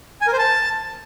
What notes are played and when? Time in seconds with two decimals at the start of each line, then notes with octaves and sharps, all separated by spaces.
0.21 G#5
0.27 A#4
0.33 C5
0.39 A5